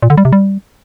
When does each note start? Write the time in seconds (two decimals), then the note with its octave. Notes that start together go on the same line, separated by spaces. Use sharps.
0.03 A#2
0.10 D3
0.18 G3
0.25 C3
0.33 G3